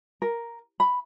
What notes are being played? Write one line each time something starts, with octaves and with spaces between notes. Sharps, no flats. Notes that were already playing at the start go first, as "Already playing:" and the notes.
A#4
B5